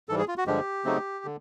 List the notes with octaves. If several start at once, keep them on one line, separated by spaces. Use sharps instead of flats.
G#2 E3 G3 A4
G#4
F4
F#4
G2 D3 F3 G#3 G4
C#3 F#3 A3 C4 D#4
D3